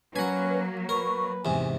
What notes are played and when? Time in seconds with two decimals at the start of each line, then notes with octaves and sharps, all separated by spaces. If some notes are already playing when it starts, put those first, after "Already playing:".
0.16 F#3 A#3 C#4 B4 F#5 G#5
0.89 A#4 B4 C#6
1.45 E2 G#2 C3 G#5